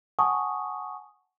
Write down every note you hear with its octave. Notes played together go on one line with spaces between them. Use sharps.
F#5 G#5 A5 C#6 D#6